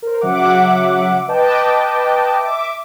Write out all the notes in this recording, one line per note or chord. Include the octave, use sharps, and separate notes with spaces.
A#4 C5
C#3 F#3 E5 F#5 D6
B4 D#5 G5 A5 D6
E5 D6